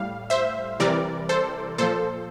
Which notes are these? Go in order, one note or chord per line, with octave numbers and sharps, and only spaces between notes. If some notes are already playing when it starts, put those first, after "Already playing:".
Already playing: A2 G3 F5
C5 E5
C3 E3 G3 A#4 D5
A4 C5
A#2 F3 A4 C5